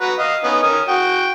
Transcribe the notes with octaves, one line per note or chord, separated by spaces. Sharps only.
F#4 B4 A#5
D#5 F5
B3 C#4 D#4
C#4 A#4 D#6
F#4 G5